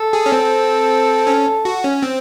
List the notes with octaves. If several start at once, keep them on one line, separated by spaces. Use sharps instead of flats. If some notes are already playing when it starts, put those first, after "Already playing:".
Already playing: A4
G#4
C#4
C4
C#4
F#4
C#4
C4